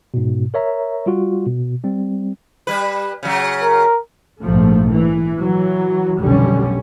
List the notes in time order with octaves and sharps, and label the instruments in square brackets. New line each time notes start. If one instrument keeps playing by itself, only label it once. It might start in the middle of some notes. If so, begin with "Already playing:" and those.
[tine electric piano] G#2 B2
A#4 C#5 E5 A#5
G3 F4 F#4
B2
G3 C4
[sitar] G3 B4
C#3 F#3
[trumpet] A#4
[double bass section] A#1 G#2 F3 A3
E3
E3 F#3
F1 B1 D3 G3 C#4